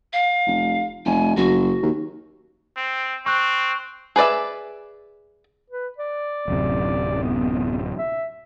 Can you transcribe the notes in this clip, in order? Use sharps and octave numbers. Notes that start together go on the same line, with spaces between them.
F5
F1
F1 G#5
F#1 F#4
D#2
C4
C4 C#6 F#6
G#4 B4 D5 E5
B4
D5
D1 F#2 C3
B3
E5